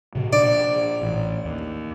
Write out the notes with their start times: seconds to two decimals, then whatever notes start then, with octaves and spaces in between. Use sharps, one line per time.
0.15 A2 C3
0.33 A#2 D4 D5
1.01 A1
1.45 D#2